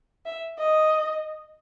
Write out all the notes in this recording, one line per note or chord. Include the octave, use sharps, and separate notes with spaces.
E5
D#5